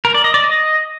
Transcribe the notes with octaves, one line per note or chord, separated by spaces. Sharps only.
A#4
D5
D#5
D5
D#5